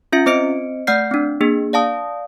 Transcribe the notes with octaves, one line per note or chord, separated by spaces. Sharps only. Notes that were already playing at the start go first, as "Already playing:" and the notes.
C#4 F4 E5 C#7
C4 C5 D#5 C#7 D7
A3 D5 F#5 F6 G6 C7
C4 D4
A#3 D4 G#4
D5 F5 A5 D#6